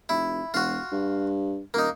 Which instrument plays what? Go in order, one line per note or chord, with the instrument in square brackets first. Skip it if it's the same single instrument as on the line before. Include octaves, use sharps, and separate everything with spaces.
[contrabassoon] F1 [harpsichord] E4
[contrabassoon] E1 [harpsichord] F4 F#4
[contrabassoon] G2
[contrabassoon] D#1 [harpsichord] A#3 D#4